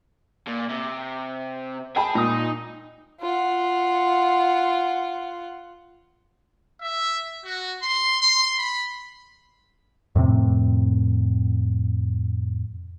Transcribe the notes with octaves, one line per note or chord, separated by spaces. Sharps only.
A#2
C3
G#4 G5 A5 B5
A#2 D#4 D#6
F4 F#5
E5
F#4
C6
C6
B5
F2 A2 C3 C4